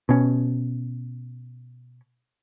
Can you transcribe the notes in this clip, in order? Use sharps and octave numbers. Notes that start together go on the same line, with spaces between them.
B2 C#4